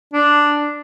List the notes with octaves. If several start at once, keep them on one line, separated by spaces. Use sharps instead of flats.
D4